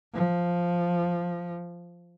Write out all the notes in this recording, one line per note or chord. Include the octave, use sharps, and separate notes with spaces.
F3